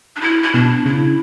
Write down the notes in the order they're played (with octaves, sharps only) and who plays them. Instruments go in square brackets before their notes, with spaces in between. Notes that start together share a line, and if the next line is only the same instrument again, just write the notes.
[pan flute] D4
E4
E4
[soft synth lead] B2 [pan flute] D4
[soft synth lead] C#3 [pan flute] E4